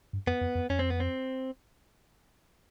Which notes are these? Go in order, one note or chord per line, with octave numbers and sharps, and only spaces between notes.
G2
F2 B3
F2
F2
F2 C#4
C4
B3
C4